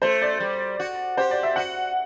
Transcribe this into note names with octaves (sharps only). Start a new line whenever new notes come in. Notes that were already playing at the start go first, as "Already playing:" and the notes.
A3 C5
D5
G3
F#4
G4 C5
D5
E5
F#4 F#5